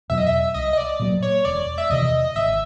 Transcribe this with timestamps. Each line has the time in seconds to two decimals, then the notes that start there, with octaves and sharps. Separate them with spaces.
0.10 E2 B2 F#3 E5
0.18 D#5
0.27 E5
0.54 C2 D#5
0.73 D#5
0.77 D5
0.99 A#2 F#3 A#3
1.22 C#5
1.45 E1 D5
1.78 E5
1.90 E2 C3 E3 D#5
2.35 G#1 E5